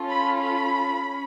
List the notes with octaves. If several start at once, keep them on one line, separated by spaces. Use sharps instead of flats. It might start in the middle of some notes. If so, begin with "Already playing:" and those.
Already playing: C#4 F4 A4
B5
B5
C#4